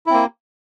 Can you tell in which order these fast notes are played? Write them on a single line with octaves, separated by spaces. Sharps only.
E4 C4 A#3